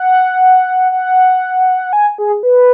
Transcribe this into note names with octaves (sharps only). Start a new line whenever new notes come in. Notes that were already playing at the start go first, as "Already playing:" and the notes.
Already playing: F#5
F#5
G#5
G#4
B4